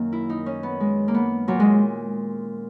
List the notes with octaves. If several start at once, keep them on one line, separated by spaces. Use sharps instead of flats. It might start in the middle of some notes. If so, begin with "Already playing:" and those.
Already playing: F#2 D#3 A#3
E4
D#4
C#4
B3
G#3
A#3
B3
A#2 F#3
G#3